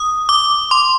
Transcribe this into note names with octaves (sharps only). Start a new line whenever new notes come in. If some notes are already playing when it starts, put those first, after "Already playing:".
Already playing: D#6
D6
C6